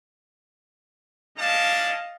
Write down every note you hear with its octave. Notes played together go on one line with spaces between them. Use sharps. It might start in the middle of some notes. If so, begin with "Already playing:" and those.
C#4 D4 D#5 F5 A5